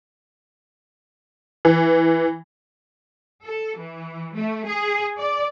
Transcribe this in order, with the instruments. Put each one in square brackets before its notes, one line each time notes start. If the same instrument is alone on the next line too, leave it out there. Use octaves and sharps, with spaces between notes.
[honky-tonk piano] E3
[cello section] A4
E3
A3
G#4
D5